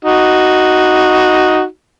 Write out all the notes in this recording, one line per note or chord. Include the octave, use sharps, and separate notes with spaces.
D#4 F#4